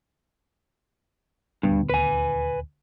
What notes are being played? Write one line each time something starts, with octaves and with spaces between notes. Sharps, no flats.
D#1 D2 G2 B3
B4 G#5